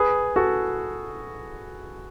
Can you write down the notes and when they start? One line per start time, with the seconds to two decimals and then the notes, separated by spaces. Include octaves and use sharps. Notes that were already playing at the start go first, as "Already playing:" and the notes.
Already playing: G#4 B4
0.36 F#4 A4